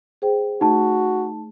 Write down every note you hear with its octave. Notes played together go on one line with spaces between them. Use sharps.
G#4 C5 G5
A3 D#4 F#4 A5